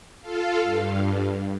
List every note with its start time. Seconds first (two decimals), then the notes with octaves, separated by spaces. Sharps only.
0.22 F4 A4 F5
0.63 G2